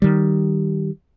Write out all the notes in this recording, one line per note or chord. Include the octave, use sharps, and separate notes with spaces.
D#3 G3